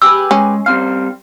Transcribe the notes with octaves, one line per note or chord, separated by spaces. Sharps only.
G4 G#4 B4 E6
G#3 C#4
G3 C4 F5 F6